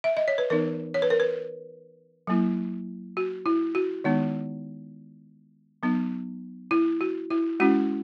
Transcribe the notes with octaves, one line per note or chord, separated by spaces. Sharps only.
E5
D#5
C#5
B4
E3 B3 D#4 A#4
C#5
B4
A#4
B4
F#3 A#3 E4
F#4
E4
F#4
D#3 G#3 B3 D#4
F#3 B3 D#4
E4
F#4
E4
G#3 C#4 E4 F#4